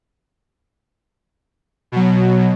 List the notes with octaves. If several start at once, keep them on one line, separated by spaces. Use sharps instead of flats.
B2 F#3